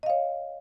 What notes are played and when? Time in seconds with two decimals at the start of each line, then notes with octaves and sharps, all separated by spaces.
0.03 D#5
0.06 F5
0.10 C#5